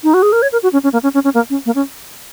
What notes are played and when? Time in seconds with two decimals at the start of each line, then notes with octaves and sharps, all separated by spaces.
0.04 D#4
0.14 F#4
0.22 G#4
0.32 A#4
0.42 C#5
0.52 A#4
0.63 F#4
0.73 C#4
0.84 C#4
0.93 A#3
1.03 C#4
1.14 C#4
1.24 C#4
1.34 A#3
1.50 C#4
1.66 A#3
1.75 C#4